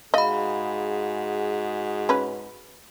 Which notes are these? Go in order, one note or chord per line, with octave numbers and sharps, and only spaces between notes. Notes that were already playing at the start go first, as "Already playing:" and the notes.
G#2 F#4 G#4 D#5 F5 B5
C#4 B4